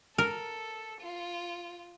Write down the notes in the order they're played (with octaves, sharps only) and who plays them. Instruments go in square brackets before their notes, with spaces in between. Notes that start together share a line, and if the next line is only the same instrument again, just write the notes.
[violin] A4 [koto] A#4
[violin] F4